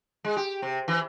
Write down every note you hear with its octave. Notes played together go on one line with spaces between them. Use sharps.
G#3
G4
C3
E3